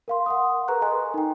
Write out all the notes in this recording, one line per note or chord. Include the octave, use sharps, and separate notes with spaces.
A#4 F5 C6
F#5 C6 D#6
G#4 A#4 B4 A#5 C#6 F#6
A4 D#5 G#5 A#5 C6
D#4 G5